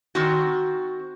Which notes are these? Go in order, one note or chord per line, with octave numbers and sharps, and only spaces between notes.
D#3 C4 F#4